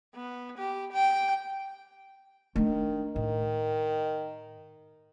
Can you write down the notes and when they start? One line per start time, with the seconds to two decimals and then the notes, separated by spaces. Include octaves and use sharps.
0.15 B3
0.58 G4
0.92 G5
2.56 D#3 A3 D4
3.16 A2 D#3